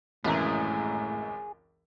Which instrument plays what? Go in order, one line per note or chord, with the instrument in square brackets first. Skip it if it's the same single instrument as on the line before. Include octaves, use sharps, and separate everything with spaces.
[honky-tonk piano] G#1 C#2 [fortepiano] F#2 E3 A#5 [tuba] A2 [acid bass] G#4